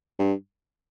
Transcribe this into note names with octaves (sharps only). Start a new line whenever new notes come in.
G2